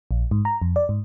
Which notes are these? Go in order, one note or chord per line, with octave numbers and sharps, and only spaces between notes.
A#1
G#2
A#5
F2
D5
G#2